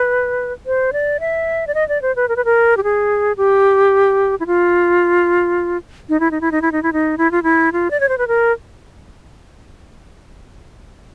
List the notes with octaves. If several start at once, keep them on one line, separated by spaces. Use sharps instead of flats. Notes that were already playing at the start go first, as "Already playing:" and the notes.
Already playing: B4
C5
D5
E5
D5
D#5
D5
C5
B4
A#4
B4
A#4
G4
G#4
G4
E4
F4
D#4
E4
D#4
E4
D#4
E4
D#4
E4
D#4
E4
F4
E4
F4
D5
C#5
C5
B4
A#4